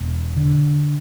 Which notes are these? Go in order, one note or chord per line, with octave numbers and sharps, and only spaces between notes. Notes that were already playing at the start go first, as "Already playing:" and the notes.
Already playing: E1
D3